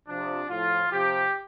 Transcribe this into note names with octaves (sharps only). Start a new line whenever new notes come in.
C3 F3 D4
A2 F3 F4
C3 F3 G4